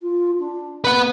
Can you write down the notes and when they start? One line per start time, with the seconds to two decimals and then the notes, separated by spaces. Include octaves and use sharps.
0.01 F4
0.39 D4
0.84 A#3 B4 F#5